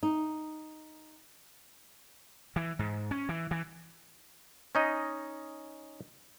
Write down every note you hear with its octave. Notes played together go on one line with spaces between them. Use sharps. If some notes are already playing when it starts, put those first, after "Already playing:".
D#4
E3
G#2
C#4
E3
E3
C#4 D#4 D#5